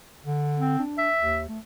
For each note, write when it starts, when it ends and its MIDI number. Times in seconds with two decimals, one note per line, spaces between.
0.25 0.78 50
0.58 0.83 60
0.79 1.08 62
0.98 1.42 76
1.20 1.48 39
1.48 1.58 57